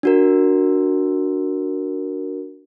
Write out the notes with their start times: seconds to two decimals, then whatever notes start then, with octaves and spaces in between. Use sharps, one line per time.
0.03 D4 F#4 A#4